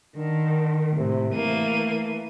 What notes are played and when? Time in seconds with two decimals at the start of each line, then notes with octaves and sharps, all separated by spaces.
0.16 D3 D#3
0.97 A2 C3
1.35 E3 A3 A#3 D#7